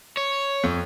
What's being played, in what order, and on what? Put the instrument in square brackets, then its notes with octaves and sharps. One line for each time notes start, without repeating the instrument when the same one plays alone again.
[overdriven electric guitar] C#5
[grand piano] F2